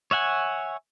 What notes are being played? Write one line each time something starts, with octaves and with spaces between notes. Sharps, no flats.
C#5 E5 F#5 G#5